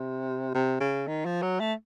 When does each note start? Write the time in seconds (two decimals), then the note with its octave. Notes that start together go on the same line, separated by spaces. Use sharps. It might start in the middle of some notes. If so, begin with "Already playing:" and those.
Already playing: C3
0.54 C3
0.80 C#3
1.07 D#3
1.25 F3
1.42 F#3
1.60 A3